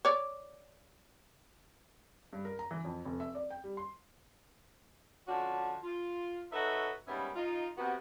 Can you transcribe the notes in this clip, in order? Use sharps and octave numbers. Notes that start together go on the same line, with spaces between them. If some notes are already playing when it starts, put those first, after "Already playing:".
C#5 D5
G2
A#4
A#5
E3
F2
F1
E5
D5
G5
G3
C6
D3 F3 C#4 D4 F#4
F4
D#4 F#4 A4 B4 C#5 E5
G#2 G3 A#3 B3 C#4 E5
D#4 F4
C3 B3 F#4